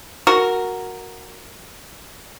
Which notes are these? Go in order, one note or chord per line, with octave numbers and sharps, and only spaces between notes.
F#4 A#4